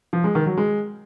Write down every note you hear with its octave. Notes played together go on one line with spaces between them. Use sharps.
F3
G#3
D#3
F#3
G#3